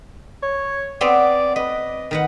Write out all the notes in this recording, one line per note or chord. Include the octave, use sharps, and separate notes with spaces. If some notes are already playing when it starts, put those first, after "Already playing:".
C#5
B3 C4 B4 D5
B4 D#5
D#3 B4 F#5